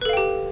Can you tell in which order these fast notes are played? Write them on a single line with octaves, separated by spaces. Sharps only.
B4 A4 F5 G5 G4